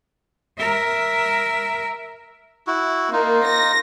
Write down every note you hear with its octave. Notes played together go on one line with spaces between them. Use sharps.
A#4 E5
E4 F#4
A#3 D#4 F4
A#6